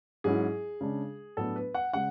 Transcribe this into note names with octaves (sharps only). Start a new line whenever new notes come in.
G#2 F#3 C#4 E4 G#4
C#3 G#3 D4
A2 F#3 B3 D4 A4
B4
F#5
C#3 G#3 F#5